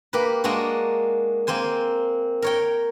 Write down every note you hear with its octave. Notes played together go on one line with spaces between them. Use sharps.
A#3 G4 A#4 B4
G#3 A#3 D4 F#4
A#3 C4 C5 G#5
A#4 C#5 G5